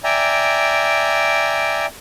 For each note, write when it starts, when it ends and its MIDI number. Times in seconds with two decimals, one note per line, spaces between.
0.04 1.86 74
0.04 1.86 76
0.04 1.86 79
0.04 1.86 80
0.04 1.86 82